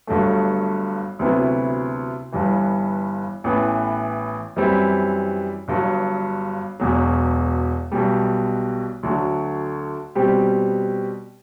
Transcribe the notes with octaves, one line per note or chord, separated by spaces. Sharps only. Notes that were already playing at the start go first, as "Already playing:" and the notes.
G1 G2 F#3 A3
D2 C3 F#3 B3 E4
G1 G2 E3
A1 A2 E3 B3
F#2 E3 G3 C4 E4
G1 G2 F#3
E1 E2 B2 F#3
B1 B2 G3
D2 D3 F#3
B2 G3 C4 G4